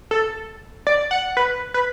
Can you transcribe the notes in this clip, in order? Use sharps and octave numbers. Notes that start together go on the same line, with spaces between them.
A4
D5
F#5
B4
B4